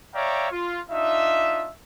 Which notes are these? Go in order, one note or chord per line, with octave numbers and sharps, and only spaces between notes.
C#5 D5 E5 F5 G5 A#5
F4
D4 D#4 F4 E5